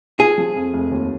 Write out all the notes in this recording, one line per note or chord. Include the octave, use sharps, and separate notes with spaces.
F4 G#4
F3
F2
F1
D#2